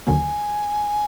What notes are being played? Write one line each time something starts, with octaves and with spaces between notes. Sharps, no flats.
D#2 D3 F#3 A#3 G#5